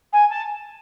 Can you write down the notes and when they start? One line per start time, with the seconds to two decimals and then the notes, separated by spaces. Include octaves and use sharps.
0.13 G#5
0.30 A5